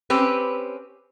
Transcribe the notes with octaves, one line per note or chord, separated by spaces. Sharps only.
C4 C#4 G4 B4